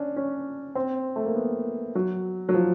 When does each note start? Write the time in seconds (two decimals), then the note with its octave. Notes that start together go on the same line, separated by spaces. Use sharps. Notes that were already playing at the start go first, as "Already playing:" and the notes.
Already playing: C#4 D4
0.16 C#4
0.75 C4
1.16 A3
1.26 A#3
1.35 B3
1.95 F#3
2.49 F#3
2.54 F3